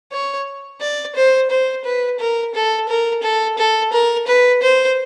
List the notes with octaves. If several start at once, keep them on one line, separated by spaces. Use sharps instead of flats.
C#5
D5
C5
C5
B4
A#4
A4
A#4
A4
A4
A#4
B4
C5